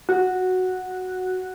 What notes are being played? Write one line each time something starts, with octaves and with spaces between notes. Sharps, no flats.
F#4